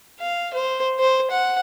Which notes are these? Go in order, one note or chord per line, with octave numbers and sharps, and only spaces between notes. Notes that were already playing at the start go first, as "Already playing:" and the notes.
F5
C5
C5
F#5